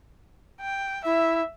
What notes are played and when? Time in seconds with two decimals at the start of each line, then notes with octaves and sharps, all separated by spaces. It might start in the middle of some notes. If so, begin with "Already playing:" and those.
0.61 G5
1.05 E4 E5